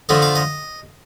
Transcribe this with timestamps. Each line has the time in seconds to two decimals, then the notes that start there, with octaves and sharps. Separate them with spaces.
0.09 D3 F3 A3 D#5
0.22 F5
0.35 D#5